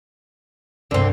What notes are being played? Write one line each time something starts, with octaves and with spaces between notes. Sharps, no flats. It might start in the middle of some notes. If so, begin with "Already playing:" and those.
C2 G2 D3 F#3 C4